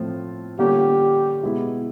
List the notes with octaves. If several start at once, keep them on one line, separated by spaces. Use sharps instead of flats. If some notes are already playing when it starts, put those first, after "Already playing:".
Already playing: A2 F3 A3 C4 F4
D3 G3 A#3 C#4 F4 G4
B2 G#3 B3 E4